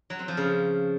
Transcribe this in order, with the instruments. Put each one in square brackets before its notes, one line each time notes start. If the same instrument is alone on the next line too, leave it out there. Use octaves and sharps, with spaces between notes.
[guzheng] F#3
C4
F3
C#3